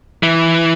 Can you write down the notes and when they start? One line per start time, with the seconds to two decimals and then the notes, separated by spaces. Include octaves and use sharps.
0.23 E3